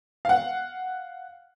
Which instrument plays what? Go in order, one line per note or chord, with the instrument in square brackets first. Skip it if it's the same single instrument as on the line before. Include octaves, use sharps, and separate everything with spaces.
[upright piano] F5 F#5